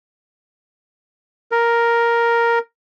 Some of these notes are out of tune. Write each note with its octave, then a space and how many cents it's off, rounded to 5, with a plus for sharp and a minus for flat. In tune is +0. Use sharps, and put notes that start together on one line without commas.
A#4 +5